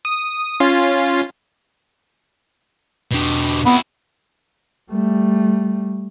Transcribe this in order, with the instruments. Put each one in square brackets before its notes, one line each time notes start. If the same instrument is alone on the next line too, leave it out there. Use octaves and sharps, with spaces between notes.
[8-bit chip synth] D#6
C#4 F4
[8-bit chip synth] E2 D4 [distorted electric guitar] B2 G4
[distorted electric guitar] F2 E4 [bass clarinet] B3
[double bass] G3 A3